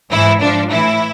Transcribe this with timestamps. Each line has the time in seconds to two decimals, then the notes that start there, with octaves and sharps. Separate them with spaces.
0.11 G#2 E3 E4
0.41 G#2 F3 D4
0.71 A2 E3 E4